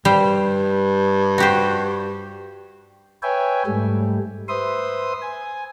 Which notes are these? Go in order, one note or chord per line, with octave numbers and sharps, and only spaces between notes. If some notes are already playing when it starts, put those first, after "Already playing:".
G2 G3 C5
F#4 G4 C5
B4 C#5 E5 G5 G#5
G#2 G3 A3
B4 C5 E5 C6 D#6
G#5